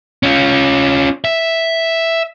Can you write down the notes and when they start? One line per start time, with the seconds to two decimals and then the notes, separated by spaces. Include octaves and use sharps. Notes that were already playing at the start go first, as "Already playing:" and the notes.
0.23 C#4 F4
1.25 E5